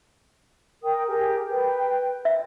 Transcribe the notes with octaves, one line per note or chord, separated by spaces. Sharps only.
A#4 G5 D#6
G4 G#4 A#4
B4 G5
E5